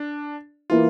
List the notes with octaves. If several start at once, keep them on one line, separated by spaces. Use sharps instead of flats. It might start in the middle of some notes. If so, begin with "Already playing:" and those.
Already playing: D4
E3 A#3 F4